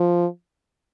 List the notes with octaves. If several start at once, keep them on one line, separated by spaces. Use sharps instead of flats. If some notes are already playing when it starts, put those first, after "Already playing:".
Already playing: F3